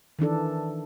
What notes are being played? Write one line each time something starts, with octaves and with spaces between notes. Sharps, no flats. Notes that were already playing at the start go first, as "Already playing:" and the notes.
D#3 E3 D4 A4